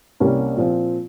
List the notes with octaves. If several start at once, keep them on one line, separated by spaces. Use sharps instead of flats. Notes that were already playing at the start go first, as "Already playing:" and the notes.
C2 C3 G3 A#3 C#4
A#2 F3 C4 F4